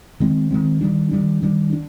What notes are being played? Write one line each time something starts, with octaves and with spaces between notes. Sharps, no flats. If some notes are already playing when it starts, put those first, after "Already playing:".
D#3 G#3 C4
D#3 G#3 C4
D#3 G3 D4
D#3 G3 D4
D#3 G3 D4
D4